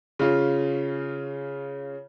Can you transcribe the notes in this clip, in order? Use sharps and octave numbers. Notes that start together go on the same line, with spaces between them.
C#3 C#4 F4